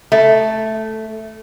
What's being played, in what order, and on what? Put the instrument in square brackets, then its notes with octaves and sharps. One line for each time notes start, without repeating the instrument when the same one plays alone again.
[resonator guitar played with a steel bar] A3